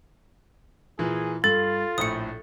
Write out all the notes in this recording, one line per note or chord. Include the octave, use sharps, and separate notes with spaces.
A#2 E3 G#4
G2 F4 A4 A6
A#1 A2 A3 D#6 C#7